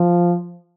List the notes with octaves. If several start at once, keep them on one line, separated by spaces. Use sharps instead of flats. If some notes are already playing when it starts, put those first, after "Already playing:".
Already playing: F3